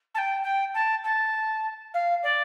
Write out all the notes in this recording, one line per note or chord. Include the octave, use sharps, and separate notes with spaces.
A5
G5
G5
A5
A5
F5
D5